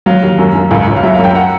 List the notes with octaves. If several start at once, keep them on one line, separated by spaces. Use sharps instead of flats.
F#3 F5
D#2
F#2
F#2
C#2
C#2
F5
F#3 E5
F#2 F5
G5
F#5